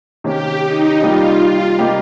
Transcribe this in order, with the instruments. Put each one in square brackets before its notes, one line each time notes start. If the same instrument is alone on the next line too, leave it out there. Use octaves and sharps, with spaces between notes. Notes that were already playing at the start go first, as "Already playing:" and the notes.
[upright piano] C3 D#3 A#3 C#4 [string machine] G4
[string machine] D#4
[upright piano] C3 G3 A#3 D#4 G4 [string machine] F4
[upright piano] C3 G3 A#3 D#4 G4